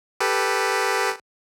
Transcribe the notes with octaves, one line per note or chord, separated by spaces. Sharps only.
G4 A4 B4